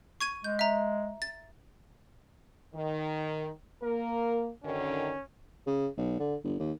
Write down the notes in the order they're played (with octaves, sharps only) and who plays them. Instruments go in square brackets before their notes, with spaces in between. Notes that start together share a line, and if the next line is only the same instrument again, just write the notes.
[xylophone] C#6 G#6 D#7
[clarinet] G#3 [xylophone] G6
[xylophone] E5 A#5
A6
[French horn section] D#3
[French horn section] A#3 [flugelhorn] A#4
[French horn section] F#2 D3 D#3 [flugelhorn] C#4
[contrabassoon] C#3
B1
D3
G1
D#2